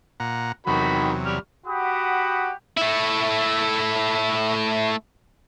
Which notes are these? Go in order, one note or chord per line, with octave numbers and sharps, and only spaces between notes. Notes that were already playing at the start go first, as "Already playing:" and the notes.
A#2 F#5 A#5
E2 C3 D#3 F#3 F#4 B5
G3 F6
F#4 G4 F#5 B5 D#6
A3 E4